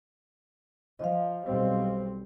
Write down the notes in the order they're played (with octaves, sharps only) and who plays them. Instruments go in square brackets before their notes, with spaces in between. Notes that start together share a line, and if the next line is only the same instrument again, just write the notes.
[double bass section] F3 [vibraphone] D#5 F5
[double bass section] B1 G3 C4